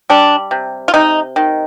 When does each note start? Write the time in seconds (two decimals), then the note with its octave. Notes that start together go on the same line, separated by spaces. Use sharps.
0.10 G3 D4
0.51 C3
0.88 F4
0.94 C3 D#4
1.36 D#3